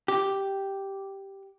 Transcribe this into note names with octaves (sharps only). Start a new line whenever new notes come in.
G4